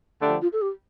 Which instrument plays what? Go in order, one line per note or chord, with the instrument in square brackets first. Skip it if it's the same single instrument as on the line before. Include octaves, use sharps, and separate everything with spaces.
[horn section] D3 F3 A3 D4 G4
[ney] F4
A4
G4